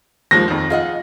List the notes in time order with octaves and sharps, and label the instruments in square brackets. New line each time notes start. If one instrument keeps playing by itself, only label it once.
[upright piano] D#2 F3 G#3 [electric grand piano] A#6
[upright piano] F2 D#3
[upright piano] F4 [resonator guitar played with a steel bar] G#4 D#5 F#5